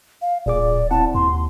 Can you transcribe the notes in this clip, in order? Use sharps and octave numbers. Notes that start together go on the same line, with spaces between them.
F5
D1 A#2 G#4 D5 D6
C4 E4 F#5 A5
D#2 C6